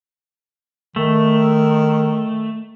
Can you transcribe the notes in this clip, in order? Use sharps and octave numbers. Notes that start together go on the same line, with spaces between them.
D#3 A3